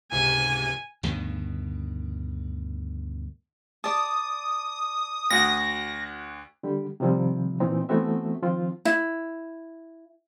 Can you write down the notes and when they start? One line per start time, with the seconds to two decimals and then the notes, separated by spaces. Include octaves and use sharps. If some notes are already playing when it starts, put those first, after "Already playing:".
0.12 C#2 G#2 C3 G#5
1.03 D2 G2 B2 D#3
3.84 D5 A5 D#6
5.30 D2 F#4 A#6
6.63 D3 G3 G4
7.00 C3 D#3 F3 G3 C4
7.60 A#2 E3 A#3 C4 D#4
7.89 E3 A3 B3 C4 F#4 E5
8.42 D#3 F3 C4 F4
8.85 E4